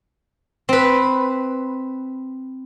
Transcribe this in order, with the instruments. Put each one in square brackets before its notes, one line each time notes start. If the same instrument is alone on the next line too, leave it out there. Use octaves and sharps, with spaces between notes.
[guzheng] C4 B4